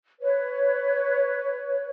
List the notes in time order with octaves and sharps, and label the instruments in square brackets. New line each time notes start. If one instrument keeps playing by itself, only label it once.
[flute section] B4 C#5